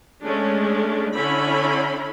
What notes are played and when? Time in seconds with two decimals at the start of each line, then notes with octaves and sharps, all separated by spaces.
0.23 G#3 A3 C#4 D4
1.14 D3 C#4 E4 C#5 B5